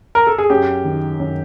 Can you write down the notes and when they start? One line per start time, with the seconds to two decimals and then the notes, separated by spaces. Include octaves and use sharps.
0.15 A#4
0.27 A4
0.38 G#4
0.50 F#2 G4
0.84 D#3
1.20 F#2